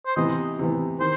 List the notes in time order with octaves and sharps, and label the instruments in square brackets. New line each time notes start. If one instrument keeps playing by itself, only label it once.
[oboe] C5
[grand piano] C3 E3 B3 [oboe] D#5
[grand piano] C3 E3 B3
[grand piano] D#3 [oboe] C5